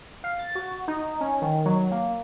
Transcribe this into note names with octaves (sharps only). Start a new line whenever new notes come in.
F5
A6
F#4
D#4
C#4
D#3
F#3
A#3